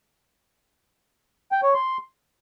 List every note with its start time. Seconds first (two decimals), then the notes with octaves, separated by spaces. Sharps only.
1.52 G5
1.63 C#5
1.74 C6